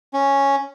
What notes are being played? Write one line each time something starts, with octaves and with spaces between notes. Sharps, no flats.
C#4